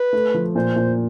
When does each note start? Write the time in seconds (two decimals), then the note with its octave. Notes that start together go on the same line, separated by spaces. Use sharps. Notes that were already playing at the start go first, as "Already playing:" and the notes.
Already playing: B4
0.13 A3
0.34 F3
0.55 A#2 C5
0.76 A#2